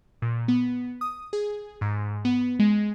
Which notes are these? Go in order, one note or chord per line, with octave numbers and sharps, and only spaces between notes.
A#2
B3
D#6
G#4
G#2
B3
G#3